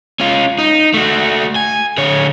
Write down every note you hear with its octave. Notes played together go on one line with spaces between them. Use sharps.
C#4 F4
D#4
A3 F#4
G#5
D3 C#5